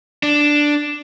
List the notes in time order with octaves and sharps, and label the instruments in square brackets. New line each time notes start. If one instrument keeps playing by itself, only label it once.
[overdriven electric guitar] D4